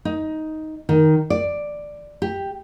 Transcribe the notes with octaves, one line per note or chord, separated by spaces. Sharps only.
D#4
D#3
D5
G4